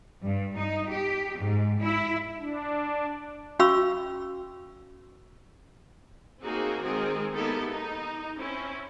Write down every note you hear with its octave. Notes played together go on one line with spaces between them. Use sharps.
G2
D#4
G4
G#2
E4
D4
C#4 F#4 F5 B5 C#6 E6
A#3 C4 D#4 F#4 G#4
D#3 G#3 C4 G#4
A#3 B3 D#4 E4 G4 A4
D#4
C4 C#4 E4